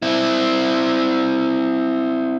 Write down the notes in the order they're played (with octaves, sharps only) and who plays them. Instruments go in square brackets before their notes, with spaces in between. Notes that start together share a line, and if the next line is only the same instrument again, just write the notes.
[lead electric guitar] C4 E4